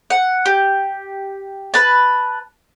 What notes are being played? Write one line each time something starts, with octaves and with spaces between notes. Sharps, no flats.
F#5
G4
B4 A5